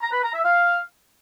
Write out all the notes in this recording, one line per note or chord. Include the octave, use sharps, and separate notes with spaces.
A#5
B4
A#5
E5
F5